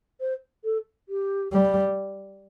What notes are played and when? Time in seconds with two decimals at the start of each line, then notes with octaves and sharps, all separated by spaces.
0.20 C5
0.64 A4
1.09 G4
1.53 G3